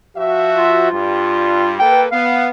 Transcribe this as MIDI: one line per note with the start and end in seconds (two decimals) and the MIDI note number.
0.16 0.90 53
0.16 0.90 66
0.16 0.90 76
0.57 1.74 65
0.91 1.77 43
0.91 1.77 55
1.80 2.06 58
1.80 2.06 69
1.80 2.06 71
1.80 2.02 79
2.12 2.51 59
2.12 2.48 77